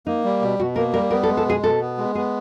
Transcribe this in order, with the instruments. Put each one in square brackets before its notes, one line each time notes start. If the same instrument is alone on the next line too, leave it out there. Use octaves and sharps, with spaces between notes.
[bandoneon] A#3 [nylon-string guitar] D#4
[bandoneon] G3
B2
[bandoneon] B2 [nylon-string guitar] F#4
[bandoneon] A#3 [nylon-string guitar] A#4
[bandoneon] G3 [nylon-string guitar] A#4
[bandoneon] B3 [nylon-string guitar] A#4
[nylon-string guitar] A4
[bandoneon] G#3
[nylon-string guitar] A4
[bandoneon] B2 [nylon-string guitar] G#4
[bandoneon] B2 [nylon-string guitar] A4
[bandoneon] B3
G#3
[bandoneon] B3 [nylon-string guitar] G#4